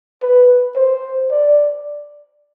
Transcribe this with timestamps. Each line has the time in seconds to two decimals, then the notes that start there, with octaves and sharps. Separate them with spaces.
0.22 B4
0.76 C5
1.31 D5